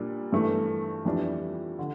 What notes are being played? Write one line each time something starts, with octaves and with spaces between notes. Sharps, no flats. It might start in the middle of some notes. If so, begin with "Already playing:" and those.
Already playing: A#2 G3 D4
G2 E3 A3
F2 E3 G3 D4
D3